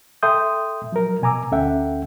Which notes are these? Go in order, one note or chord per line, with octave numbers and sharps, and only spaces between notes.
A4 E5 G5 C6 D#6 G6
F3 F#3 A#4
B2 G#5 A#5 D6 E6
D2 C#4 A4 E5 F#5 G5